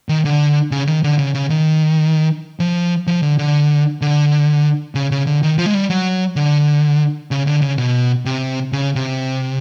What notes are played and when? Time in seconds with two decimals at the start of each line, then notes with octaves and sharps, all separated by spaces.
0.09 D#3
0.25 D3
0.71 C#3
0.87 D#3
1.04 D3
1.18 C#3
1.34 C#3
1.50 D#3
2.60 F3
3.07 F3
3.22 D3
3.38 D3
4.02 D3
4.95 C#3
5.11 C#3
5.27 D3
5.43 D#3
5.58 F3
5.66 G#3
5.74 G3
5.90 F#3
6.36 D3
7.31 C#3
7.47 D3
7.62 C#3
7.78 B2
8.25 C3
8.73 C#3
8.95 C3